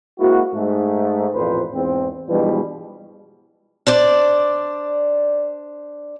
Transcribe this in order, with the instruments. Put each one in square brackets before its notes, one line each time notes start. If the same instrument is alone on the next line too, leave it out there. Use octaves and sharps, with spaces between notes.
[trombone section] G#3 A#3 C4 E4 F#4
G#2 A3
A1 F2 A#2 B4 C5
E2 G#2 C4
G2 B2 E3 F3 G3 G#3
[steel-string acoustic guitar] D4 C5 D5